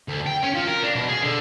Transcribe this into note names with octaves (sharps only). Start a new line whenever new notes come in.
D2
G5
C#4
F3
A#4
D4
B2
G#4
D3